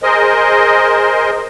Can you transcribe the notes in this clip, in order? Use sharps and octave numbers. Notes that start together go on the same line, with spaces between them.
G#4 A#4 C5 D#5